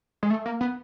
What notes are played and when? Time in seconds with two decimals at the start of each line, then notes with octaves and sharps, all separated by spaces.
0.23 G#3
0.30 A3
0.46 A#3
0.61 B3